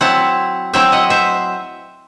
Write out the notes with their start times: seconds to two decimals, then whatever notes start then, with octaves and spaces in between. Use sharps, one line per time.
0.01 F#3 C4 E4 F#5 A5
0.73 F#3 C4 E4 E5 G5
0.92 D#5 F#5
1.10 C5 E5